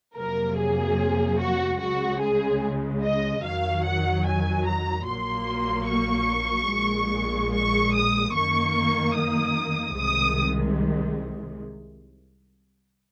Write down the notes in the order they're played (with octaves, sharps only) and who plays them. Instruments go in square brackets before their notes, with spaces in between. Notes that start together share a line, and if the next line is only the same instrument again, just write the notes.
[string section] F2 C3 F#3 A#3 A#4
G#4
F#4
C#2 C#3 G#3 F#4
G#4
D#5
F2 D#3 F#3 F5
F#5
G#5
A#5
A#1 A#2 F#3 A#3 C6
C#6
A#1 A#2 G#3
C#6
D#6
F#2 D#3 A#3 C#6
D#6
C2 C3 D#3 G#3 D#6